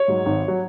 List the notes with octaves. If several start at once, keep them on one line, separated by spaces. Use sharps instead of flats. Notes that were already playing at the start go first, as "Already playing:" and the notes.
Already playing: C#5
G#2 F#3
G#1
F#3